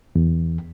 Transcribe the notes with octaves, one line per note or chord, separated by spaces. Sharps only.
E2